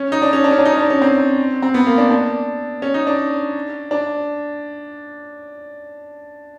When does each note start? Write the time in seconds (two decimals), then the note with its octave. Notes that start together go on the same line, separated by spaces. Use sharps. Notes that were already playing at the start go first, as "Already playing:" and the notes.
Already playing: C#4
0.12 D#4
0.22 D4
0.33 C#4
0.44 D4
0.51 C#4
0.59 D4
0.65 D#4
0.72 C#4
0.78 D4
0.90 C#4
1.02 C4
1.62 C4
1.74 B3
1.87 A#3
1.98 D4
2.10 D4
2.82 C#4
2.94 D#4
3.07 D4
3.91 D4